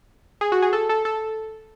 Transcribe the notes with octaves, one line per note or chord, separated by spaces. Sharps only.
G#4
F#4
G#4
A4
A4
A4